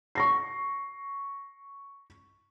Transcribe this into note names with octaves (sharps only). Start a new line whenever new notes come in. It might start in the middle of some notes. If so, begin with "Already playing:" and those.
C#6 A#6 C7